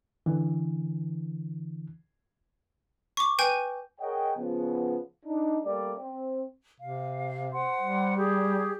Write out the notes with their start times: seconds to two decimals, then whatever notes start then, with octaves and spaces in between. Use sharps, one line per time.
0.26 D3 E3
3.17 C#6 D6
3.39 B4 G5 G#5 G6 D#7
4.00 G#4 A#4 C#5 D#5 F#5 G5
4.37 C#3 F3 B3
5.25 D4 D#4
5.64 G3 A3 A#3 D5
5.98 C4
6.80 C3 F5
7.53 C5 F#5 C6
7.81 G3
8.17 G4 G#4